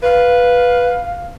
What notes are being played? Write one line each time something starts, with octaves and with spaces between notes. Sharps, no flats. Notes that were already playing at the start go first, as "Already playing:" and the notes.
B4 F5